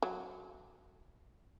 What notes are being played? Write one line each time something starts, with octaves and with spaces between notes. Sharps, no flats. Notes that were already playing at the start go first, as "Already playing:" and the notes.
F#3